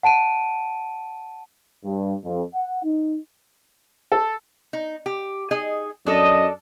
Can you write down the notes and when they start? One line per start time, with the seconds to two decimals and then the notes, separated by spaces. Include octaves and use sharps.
0.03 F#5 A5 D7 D#7
1.84 G2
2.24 F2
2.54 F#5
2.83 D#4
4.12 A4
4.73 D#4
5.06 G4
5.51 D#4 G#4 D#5
6.06 F#2 D4 A4 D#5